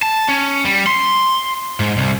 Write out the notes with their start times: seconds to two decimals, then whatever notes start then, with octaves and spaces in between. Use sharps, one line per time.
0.02 A5
0.29 C#4
0.65 G3
0.87 C6
1.80 G#2
1.98 C2